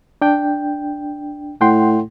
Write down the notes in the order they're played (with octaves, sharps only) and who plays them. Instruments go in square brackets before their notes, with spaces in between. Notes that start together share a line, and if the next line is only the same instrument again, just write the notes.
[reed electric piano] D4 G5
[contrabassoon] A2 [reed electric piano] F#5 G5 C6